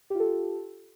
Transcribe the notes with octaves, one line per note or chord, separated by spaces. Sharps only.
F4 G4 A4